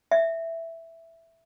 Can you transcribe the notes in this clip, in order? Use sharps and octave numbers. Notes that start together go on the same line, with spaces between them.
E5